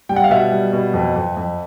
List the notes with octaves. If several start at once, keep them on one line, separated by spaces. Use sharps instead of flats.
G3 G5
F#5
F5
B2 E5 F#5
G3
B2
F2
F2
F2